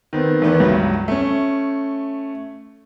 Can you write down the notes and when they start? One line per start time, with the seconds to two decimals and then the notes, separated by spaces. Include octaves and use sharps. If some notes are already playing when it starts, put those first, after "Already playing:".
0.13 D#3 B3 C4
0.42 E2 D#3 A3 B3
0.60 C#2 G2 F#3
1.08 A3 C#4